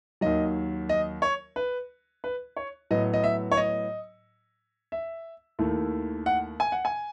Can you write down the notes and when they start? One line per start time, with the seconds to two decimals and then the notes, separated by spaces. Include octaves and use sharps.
0.21 D#2 D#3 F#3 D#5
0.89 D#5
1.22 C#5
1.56 B4
2.24 B4
2.57 C#5
2.91 A2 F#3 B3 D#5
3.14 D#5
3.24 E5
3.52 C#5
3.57 D#5
4.92 E5
5.59 D#2 D#3 A3 E4
6.26 F#5
6.60 G#5
6.72 F#5
6.85 G#5